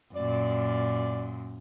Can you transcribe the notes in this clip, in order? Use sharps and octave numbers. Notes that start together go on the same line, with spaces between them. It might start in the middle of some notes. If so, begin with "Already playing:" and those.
F#2 A#2 D5